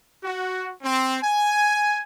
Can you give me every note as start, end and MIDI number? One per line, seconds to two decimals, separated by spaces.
0.23 0.68 66
0.82 1.17 60
1.22 2.01 80